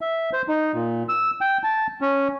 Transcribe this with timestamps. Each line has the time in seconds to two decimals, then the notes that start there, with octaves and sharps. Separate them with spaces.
0.01 E5
0.33 C5
0.48 D#4
0.74 A#2
1.09 E6
1.41 G5
1.63 A5
2.01 C#4